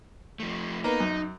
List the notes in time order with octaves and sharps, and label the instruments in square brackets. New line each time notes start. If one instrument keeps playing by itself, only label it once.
[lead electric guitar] F3 A3
[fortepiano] A#3 B3 [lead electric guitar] D#4
[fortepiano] F#2